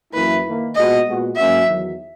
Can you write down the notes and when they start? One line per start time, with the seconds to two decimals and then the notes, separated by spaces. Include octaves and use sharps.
0.14 F#2 E3 A#3 E4 B4
0.44 D#3 A#3 E4
0.75 A#2 G#3 B3 F#4 D#5
1.06 A#2 G#3 B3 F#4
1.36 G#2 F#3 A#3 C#4 F#4 E5
1.67 E2 D#3 F#3